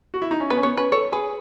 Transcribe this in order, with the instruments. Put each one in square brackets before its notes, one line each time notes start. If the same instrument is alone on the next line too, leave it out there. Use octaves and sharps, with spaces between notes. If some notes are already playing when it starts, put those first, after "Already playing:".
[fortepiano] F#4
E4
D#4
C#4
[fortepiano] B3 [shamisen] B4
[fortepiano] C#4
[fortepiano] B3 [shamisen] C#5
[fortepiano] C#4 [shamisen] B4
[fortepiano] A4 [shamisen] C#5
[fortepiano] G#4 [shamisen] B4